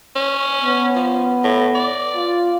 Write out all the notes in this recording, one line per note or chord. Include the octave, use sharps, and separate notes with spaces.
C#4
B3
F3
A2
D5
F4